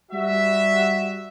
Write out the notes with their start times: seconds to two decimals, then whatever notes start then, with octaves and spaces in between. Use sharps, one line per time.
0.11 G3 F#4 E5